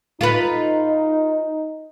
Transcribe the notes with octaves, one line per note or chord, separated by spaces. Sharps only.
D#4 F4 A4 B4